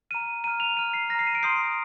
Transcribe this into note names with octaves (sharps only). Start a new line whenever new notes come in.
A#5 F6 D#7
A#5 F6 D#7
F7
A#5 F6 D#7
C7
A#5 F6 A#6 C7
D#7
D7
C6 D#6 G6 C7